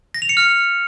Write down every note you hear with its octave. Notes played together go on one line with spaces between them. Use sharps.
A#6
F7
C#7
F6